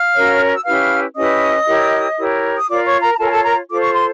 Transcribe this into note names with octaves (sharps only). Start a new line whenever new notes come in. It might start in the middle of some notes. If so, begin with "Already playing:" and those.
Already playing: F5 F6
C#4 F#4 A#4 C#5
E6
C#4 E4 G4 B4 F5 F6
C#4 E4 G4 B4 D#5 D#6
E4 G4 A#4 C#5
E4 G4 A#4 C#5
D#6
F4 A#4 C#5 D5 D6
C#5 C#6
A#4 A#5
A#5
F4 A4 A#4 C#5 A5
G#5
A4 A5
A#4 A#5
F4 A4 C5 D6
C#6
C6